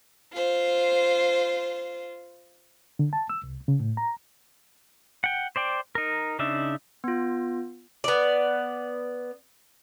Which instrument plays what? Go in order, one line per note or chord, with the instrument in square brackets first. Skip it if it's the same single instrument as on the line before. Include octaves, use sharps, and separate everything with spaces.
[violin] F4 C5
[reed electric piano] D3
A5
E6
C2
C#3
A2
A#5
[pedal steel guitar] F#5 G5
C5 D5 G5
D#4 A#4
C#3 D4 D#4 E5
[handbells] B3 F4
[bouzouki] B3 D5